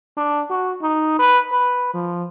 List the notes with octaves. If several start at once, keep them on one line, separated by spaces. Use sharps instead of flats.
D4
F#4
D#4
B4
B4
F3